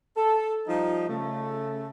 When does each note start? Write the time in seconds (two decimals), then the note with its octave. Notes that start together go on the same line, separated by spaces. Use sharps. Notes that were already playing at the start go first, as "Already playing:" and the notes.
0.17 A4
0.68 F3 G3 D#4
1.08 C#3 A3